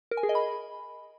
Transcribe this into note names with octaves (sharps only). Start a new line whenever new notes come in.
A#4
G#5
G#4
D#5
B5